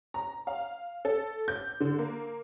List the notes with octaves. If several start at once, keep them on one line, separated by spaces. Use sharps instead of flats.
A#5
F5
A4
G6
D3
A#3